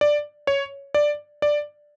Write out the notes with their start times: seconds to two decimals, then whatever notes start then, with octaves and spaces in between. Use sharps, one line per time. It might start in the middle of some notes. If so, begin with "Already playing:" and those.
0.01 D5
0.47 C#5
0.94 D5
1.42 D5